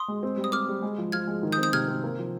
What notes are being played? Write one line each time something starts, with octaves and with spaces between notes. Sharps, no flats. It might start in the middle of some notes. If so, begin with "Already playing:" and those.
Already playing: C6 D#6
G#3
C4
G3
D#6
C4 D6 F6
G3
G#3
F3
F3 F6 G#6
G#3
D#3
D#6 G6
C4
D#6 G6
C3 F6 G#6
C4
A#3
F3